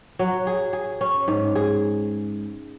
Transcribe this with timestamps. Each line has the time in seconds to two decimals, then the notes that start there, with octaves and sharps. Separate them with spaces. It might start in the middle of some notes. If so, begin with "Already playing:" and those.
0.19 F#3
0.47 G#4
0.73 G#4
1.01 C#4
1.28 G#2
1.55 G#4